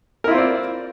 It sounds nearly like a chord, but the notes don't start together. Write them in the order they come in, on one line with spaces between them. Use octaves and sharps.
A#4 E4 F4 C4 D5